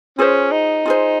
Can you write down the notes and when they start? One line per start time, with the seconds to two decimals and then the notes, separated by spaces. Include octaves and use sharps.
0.18 C#4 F4 G#4 C5
0.52 D#4
0.86 F4 G#4 C5